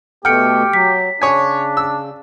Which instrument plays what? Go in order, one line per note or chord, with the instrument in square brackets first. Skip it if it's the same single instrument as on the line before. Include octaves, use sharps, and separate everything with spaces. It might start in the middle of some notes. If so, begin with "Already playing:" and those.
[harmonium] B2 A3 [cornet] G4 [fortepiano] G5 [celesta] F6 C#7
[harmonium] F#3 [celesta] B6
[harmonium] C#3 [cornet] D4 [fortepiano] C#5 G#5
[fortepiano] E6